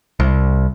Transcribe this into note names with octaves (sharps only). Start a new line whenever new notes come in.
C2